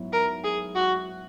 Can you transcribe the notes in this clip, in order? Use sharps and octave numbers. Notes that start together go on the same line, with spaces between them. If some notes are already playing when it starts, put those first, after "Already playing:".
Already playing: G#2 F#3 B3 E4
A#4
G#4
F#4